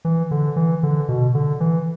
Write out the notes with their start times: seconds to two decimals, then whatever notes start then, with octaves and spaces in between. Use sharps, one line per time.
0.05 E3
0.31 D3
0.56 E3
0.83 D3
1.09 B2
1.35 D3
1.60 E3